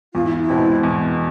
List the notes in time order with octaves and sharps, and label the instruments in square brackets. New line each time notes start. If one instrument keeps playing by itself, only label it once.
[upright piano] E2 [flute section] F4
[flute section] E4
E4
[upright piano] B2 G#3 C4
E2